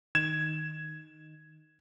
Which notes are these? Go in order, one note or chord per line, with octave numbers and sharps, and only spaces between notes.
D#3 G#6 E7